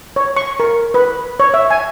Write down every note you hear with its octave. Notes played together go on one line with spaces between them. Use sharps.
C#5
C#6
A#4
B4
C#5
E5
G#5